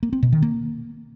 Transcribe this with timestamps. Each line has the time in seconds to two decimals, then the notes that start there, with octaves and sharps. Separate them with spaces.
0.03 A#3
0.13 C4
0.23 B2
0.32 D#3
0.42 A#3